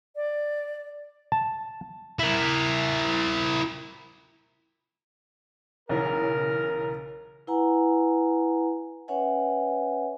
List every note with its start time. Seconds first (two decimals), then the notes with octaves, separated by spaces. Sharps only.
0.16 D5
1.32 A5
2.19 E4 A#4
5.89 B1 C#3 E3 A#4
7.47 E4 B4 F#5 G#5 A#5
9.08 C#4 B4 C#5 E5 F#5 G#5